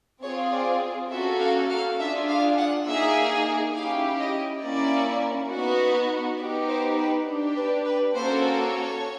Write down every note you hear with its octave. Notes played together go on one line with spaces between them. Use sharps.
C4 F4 G#4 C#5
D5
A#3 C#4 F#4 A4 E5
F5
F5
D4 F4 G#4 E5
F5
F#5
A#3 D#4 G#4 E5
C#4 E4 G4 F5
D#5
A#3 C#4 E4 D5
B3 D#4 F#4
B3 D#4 G4 D5
C5
B4
D4 G4
B4
B4
A#3 C#4 F#4 A4 C5
C#5